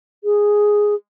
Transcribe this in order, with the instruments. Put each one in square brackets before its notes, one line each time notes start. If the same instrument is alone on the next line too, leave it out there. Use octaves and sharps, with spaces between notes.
[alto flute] G#4